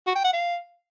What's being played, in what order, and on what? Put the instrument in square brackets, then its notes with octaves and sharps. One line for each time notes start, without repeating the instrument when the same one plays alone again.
[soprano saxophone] F#4
G5
F#5
F5